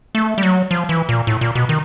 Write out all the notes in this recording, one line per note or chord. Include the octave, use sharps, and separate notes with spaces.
A3
G3
F#3
F3
E3
A#2
A2
A#2
B2
D#3